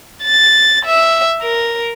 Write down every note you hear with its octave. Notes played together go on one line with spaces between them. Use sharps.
A6
E5
A#4